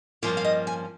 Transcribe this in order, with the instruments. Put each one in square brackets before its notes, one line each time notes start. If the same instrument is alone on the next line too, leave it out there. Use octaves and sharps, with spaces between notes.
[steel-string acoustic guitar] G2 F3 A#3 C#4 F4
F5
D#5
G#5